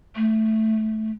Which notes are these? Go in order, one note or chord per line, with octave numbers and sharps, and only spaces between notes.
A3